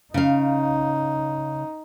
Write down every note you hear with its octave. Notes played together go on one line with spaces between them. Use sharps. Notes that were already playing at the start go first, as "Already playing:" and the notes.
C#3 D#4 F5